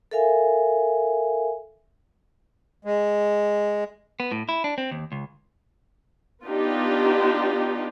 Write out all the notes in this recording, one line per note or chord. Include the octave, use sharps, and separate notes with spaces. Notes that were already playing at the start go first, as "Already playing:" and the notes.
A4 A#4 E5 F5 G#5
G#3
B3
A2
E4
D4
C4
D#2
C#2
B3 D4 D#4 F4 G4